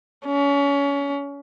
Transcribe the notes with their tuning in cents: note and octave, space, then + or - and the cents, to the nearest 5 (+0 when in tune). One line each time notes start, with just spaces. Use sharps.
C#4 +30